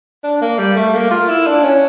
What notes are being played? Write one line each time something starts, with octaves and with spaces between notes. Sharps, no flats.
D4
A#3
G3
A3
A#3
F4
E4
D4
C#4